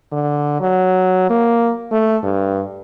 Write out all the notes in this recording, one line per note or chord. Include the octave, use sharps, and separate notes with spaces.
D3
F#3
A#3
A3
G2